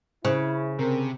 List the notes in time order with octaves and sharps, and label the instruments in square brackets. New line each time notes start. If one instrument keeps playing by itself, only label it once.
[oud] C#3 [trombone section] E4 [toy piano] C5
[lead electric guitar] C3 [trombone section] C4 A#4